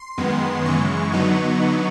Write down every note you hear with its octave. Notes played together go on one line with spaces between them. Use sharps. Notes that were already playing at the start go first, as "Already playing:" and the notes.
Already playing: C6
F#2 D#3 G#3 B3
F#2 C#3 E3 G#3 C#6
D3 F#3 B3 D#4 C#6